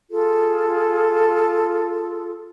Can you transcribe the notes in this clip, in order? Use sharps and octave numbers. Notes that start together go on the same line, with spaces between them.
F4 G#4 A4